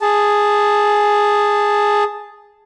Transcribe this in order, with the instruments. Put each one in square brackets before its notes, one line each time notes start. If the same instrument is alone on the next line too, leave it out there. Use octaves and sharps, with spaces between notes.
[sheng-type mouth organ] G#4 A5